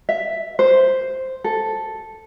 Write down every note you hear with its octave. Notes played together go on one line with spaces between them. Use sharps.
E5
C5
A4